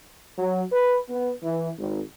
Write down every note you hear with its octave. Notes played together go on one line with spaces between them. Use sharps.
F#3
B4
B3
E3
G#1